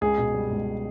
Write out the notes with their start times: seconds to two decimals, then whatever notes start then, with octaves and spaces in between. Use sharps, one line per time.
0.01 C#2 G#4
0.18 B2
0.34 G3
0.51 C#2